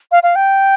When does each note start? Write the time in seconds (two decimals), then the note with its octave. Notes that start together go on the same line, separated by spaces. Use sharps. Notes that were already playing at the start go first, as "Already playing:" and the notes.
0.12 F5
0.23 F5
0.35 G5